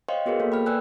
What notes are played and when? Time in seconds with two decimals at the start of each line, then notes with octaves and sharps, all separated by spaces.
0.09 C5 C#5 D#5 F5 G5 C6
0.26 B3 F#4 G#4 A#4 B4 C#5
0.40 A#3 A4
0.52 G5 B5 F6
0.66 B4 D5 G5 G#5 E6 F#6